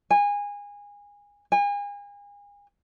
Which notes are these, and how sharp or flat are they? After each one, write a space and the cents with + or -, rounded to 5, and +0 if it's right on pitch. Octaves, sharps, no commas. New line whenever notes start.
G#5 -25
G#5 -35